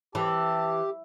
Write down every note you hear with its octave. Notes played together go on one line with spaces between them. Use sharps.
E3 G4 A5